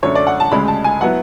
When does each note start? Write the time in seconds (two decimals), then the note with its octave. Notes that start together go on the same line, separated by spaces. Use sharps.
0.03 F#2 D3 A3 C#5
0.15 D5
0.27 F#5
0.40 A5
0.51 D2 C#3 G#3 B5
0.68 A5
0.84 G#5
1.01 F#3 B3 E4 F#5